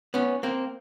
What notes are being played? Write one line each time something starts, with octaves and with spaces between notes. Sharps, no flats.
B3 C#4
A#3 C4